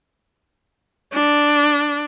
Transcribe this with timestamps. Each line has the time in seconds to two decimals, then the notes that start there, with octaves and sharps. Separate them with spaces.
1.14 D4